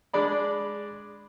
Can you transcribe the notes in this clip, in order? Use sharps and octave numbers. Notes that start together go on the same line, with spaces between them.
G#3 D4 D5 B5